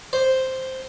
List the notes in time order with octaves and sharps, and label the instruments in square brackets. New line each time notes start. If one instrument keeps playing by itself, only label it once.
[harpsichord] C5